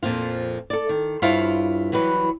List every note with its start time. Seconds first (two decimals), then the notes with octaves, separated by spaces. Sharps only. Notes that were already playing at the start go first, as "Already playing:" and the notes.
0.03 F2 A#2 F3 F4
0.70 A4 D5
0.89 D#3
1.22 G2 E4 F4 C5 C#5 F5
1.92 E3 F#3 G3 B4